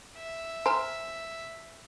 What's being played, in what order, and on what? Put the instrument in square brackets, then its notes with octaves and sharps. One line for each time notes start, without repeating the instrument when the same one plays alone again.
[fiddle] E5
[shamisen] C5 [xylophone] G#5 A#5 F6